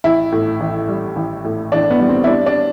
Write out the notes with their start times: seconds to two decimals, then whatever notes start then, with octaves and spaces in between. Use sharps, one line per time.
0.04 A1 E4
0.32 A2
0.60 A1
0.88 G3
1.16 A1
1.44 A2
1.72 A1 D4
1.91 B3
2.00 G3
2.09 C4
2.24 E4
2.27 G3 D4
2.46 D4